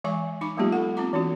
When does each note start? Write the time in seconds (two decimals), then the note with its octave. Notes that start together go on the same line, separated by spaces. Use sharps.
0.04 E3 G#3 E5 G#5 C#6
0.41 D#4 B5 D6
0.57 F#3 G#3 A#3 B3 F4 G4
0.72 A4 F#5
0.97 C4 F4 A#5 D6
1.13 E3 C4 D4 F#4